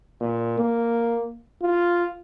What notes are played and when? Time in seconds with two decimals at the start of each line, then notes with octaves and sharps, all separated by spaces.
0.21 A#2
0.58 A#3
1.62 F4